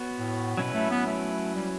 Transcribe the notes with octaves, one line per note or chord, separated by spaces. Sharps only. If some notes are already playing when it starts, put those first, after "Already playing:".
Already playing: B3 F#4 C#5
A2
B2 F#3 C#4 E4 B4
A3
B3
A3
G3